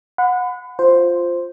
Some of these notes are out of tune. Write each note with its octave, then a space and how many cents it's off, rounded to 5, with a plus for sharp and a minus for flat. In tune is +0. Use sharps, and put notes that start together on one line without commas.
F#5 -25 B5 +30
F4 +0 C5 +0